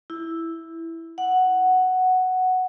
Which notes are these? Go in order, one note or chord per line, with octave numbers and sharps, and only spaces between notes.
E4
F#5